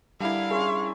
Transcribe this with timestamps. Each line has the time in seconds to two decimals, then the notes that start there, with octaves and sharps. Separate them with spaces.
0.20 D3 G3 E4 A#4 F5
0.50 C#4 G#4 C6 C#6